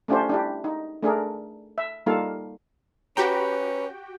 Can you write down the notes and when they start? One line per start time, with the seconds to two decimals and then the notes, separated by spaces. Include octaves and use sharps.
0.08 A3 C#4 D4 F4 G4 C5
0.29 D4 E4 G4
0.64 D#4
1.03 A3 D4 G#4 A#4
1.78 E5
2.06 G3 A#3 D#4 F4 A4 F5
3.17 C#4 F#4 G4 B4 G5 A#5 B5